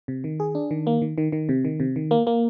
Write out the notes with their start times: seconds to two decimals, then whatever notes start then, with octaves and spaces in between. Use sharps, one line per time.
0.08 C3
0.24 D#3
0.40 G#4
0.55 D4
0.71 D#3
0.87 A#3
1.02 D#3
1.18 D#3
1.32 D#3
1.49 C3
1.65 D#3
1.80 C3
1.96 D#3
2.11 A#3
2.27 A#3